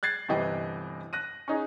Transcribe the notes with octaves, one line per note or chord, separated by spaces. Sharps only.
F#6 G#6 A6 C7
G1 C3 E3 D#5 G5
F#6 A#6 D#7
C#4 D#4 G#4